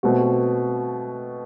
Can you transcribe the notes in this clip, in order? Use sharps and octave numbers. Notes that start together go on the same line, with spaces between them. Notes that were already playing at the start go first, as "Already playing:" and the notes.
B2 A3 C4 F#4